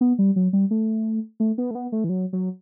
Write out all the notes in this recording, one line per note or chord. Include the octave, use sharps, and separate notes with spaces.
B3
G3
F#3
G3
A3
A3
B3
A3
B3
A3
E3
F#3
F#3